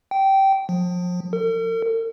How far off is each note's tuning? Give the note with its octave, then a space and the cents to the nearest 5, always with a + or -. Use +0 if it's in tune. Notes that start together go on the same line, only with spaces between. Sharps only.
G5 -15
F3 +35
A#4 -45